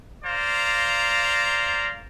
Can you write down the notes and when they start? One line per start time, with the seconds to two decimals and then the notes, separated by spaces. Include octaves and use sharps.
0.24 C5 D5 F5 A#5